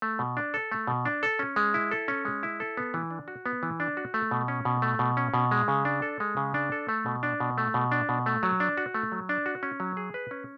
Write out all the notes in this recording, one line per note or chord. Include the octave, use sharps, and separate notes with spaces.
A3
B2
D4
A4
A3
B2
D4
A4
C#4
G#3
E4
A4
C#4
G#3
E4
A4
B3
E3
D4
F#4
B3
E3
D4
F#4
A3
B2
C#4
B2
A3
B2
C#4
B2
G#3
C#3
D4
A4
G#3
C#3
D4
A4
A3
B2
D4
B2
A3
B2
D4
B2
A3
F#3
D4
F#4
A3
F#3
D4
F#4
C#4
F#3
G#4
B4
C#4